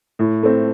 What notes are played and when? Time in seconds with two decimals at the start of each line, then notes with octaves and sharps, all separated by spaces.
0.19 A2
0.43 A3 C4